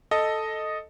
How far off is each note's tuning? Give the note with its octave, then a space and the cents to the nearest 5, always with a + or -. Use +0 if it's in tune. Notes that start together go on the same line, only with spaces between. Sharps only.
A4 +0 D#5 +0